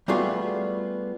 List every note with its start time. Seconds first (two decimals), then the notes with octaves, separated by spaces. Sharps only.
0.08 G3 A3 B3 F4 F#4 G#4